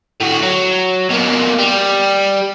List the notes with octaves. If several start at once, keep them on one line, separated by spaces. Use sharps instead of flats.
A2 F#4
F#3
B2 A#3
G3